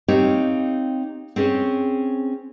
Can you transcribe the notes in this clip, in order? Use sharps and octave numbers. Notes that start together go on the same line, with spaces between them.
C4 D#4 G4 C#5 F5
C4 C#4 G#4 C5 C#5